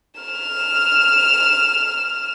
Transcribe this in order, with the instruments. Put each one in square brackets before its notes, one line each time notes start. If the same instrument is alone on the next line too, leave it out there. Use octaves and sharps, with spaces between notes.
[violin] F6 E7